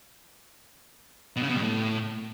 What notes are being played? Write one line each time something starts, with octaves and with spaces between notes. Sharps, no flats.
B2
C#3
B2
G2
A2